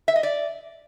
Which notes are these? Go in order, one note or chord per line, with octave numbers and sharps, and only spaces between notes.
E5
D#5
D5